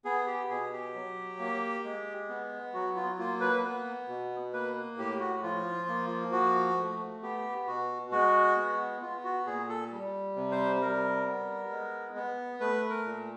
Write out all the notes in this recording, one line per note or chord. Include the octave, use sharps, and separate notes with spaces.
B3 G#4
G4
B2 G#4
G4
F#3
A#3
G#3
B3
F#3 F#4
F4
A#3 F4
B4
B3
B2
A#3 B4
A2 G4
F#4
F3 F4
A#3
F3 F#4
A3
B3 G4
B2 F#4
G#3 F#4
B3
B3 F4
F#4
A#2 G#4
A4
G3
C3
C5
G3 A#4
B3
G#3
B3
A3 B4
A#4
A#2